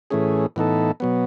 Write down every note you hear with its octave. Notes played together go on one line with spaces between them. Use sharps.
A2 E3 A3 C#4 G#4
A2 E3 B3 D#4 A4
B2 F#3 B3